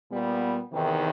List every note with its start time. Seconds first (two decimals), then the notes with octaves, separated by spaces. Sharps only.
0.10 A#2 G3 B3
0.72 E2 C3 D#3